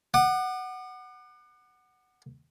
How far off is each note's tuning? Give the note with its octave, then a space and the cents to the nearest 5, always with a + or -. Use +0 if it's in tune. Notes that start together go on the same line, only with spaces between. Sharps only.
F#5 +5 D6 +45